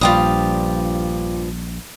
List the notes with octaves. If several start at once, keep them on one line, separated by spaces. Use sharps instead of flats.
A#1 G2 F3 G3 D4 F4 G4 D#6